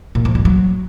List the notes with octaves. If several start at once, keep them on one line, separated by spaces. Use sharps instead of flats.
A#2
F3
G2
F#3